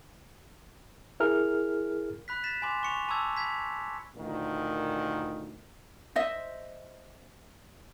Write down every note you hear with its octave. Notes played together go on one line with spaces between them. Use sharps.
E4 G#4 A#4 F6
B5 F#6 B6
A6 B6 E7
G#5 B5 C6 D6
C#6 C#7 F7
A5 B5 C#6 D6 E6 G#6
B5 G#6 B6
D2 A#2 D#3
C5 D#5 E5